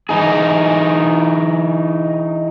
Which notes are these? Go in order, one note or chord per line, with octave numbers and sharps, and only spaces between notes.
E3 D#4 G#4